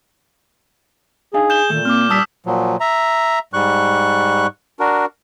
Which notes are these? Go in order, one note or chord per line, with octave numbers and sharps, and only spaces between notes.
D4 D#4 G#4 F5
G6 E7 G7
A#2 D#3 A3
A#3 C4 D6 F6
G2 G3 A5 D#6 E6 B6
A#2 F3 F#3
E5 A#5
G#2 G3 C#6 F#6
D4 F#4 A#4